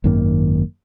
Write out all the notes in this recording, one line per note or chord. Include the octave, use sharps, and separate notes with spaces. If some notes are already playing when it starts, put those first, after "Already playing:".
G#1 F#2 D#3 A#3